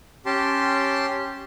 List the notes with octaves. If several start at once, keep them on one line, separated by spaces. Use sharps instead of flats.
C#4 G4 A5 C6